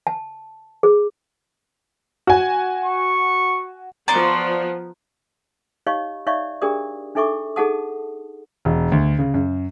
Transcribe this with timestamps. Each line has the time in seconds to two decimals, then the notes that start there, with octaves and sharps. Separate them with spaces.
0.07 A5
0.83 G#4
2.27 F#4 G#5
2.84 C#6
4.08 F3 B3 D5 A#5 C6 C#6
5.86 D#4 G4 C#5 D#5 F5 C#6
6.26 D#4 C#5 D5 E5 F5 C#6
6.62 D4 G4 G#4 A#4 D5 D#6
7.15 D4 D#4 A4 E5 C#6 D6
7.56 D#4 G#4 A4 F#5 A5 D#6
8.65 E1
8.92 D2
9.19 C#3
9.34 F#2